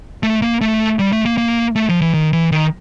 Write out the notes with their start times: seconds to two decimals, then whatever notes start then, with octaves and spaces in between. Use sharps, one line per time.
0.23 A3
0.42 A#3
0.61 A3
0.99 G3
1.12 A3
1.25 A#3
1.38 A#3
1.76 A3
1.89 F3
2.01 E3
2.14 D#3
2.33 E3
2.52 D#3